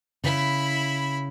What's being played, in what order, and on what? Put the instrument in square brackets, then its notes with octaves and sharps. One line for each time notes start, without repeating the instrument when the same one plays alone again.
[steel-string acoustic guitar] C#3 [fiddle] E4 B5